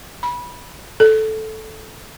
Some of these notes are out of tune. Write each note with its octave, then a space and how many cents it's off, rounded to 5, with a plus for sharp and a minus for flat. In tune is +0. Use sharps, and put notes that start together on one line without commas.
B5 -20
A4 -5